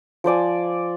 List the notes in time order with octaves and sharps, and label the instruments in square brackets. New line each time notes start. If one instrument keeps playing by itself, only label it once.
[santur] F3 C5 D5 G#5